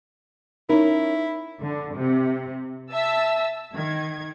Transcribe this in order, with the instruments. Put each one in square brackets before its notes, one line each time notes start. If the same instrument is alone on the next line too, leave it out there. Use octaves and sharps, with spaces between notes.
[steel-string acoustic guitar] C#4 A#4 [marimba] D#4 [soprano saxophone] E4
[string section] D3
C3
E5 A5 E6
D#3 G#6